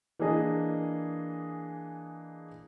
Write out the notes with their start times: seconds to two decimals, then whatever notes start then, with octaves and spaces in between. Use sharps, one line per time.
0.19 E3 A#3 D4 G#4 D#5